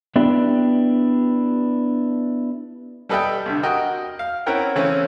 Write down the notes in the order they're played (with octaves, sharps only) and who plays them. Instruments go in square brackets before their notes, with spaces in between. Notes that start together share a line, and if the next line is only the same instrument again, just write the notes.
[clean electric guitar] B3 D4 E4 G4
[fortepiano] G3 A4 B4 D#5 E5 G5
C2 D3
F#4 A#4 D#5 G5
F5
C4 C#4 E4 A#4 F#5 G5
C#3 E3 A3 C4 C#4